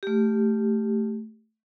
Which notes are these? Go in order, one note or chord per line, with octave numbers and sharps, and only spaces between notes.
A3 G4